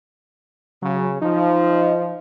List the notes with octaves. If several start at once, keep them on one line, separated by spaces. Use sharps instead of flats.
C#3 F#3
F3 D#4